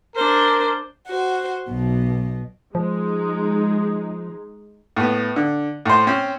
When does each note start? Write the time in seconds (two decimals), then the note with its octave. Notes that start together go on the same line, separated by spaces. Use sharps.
0.15 D4 A#4 C5
1.07 F#4 C5
1.69 B1 B2
2.75 F3 G#3 D#4
4.96 A2 B3
5.36 D3
5.85 A2 C5
6.07 C4 C#4 C5